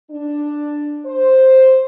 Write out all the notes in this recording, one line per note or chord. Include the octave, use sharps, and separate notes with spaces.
D4
C5